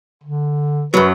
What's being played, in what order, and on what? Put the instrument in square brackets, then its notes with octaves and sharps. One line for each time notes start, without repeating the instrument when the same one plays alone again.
[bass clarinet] D3
[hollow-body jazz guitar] F#2 F#3 [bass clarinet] B4